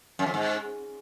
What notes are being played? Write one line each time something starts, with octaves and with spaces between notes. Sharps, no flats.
F#2
F2
G#2